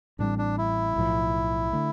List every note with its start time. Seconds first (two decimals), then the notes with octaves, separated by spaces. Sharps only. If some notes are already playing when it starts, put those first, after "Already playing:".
0.19 A1 A2 G3 C4 D4
0.39 D4
0.58 E4
0.96 B1 A2 F3
1.73 D3 A3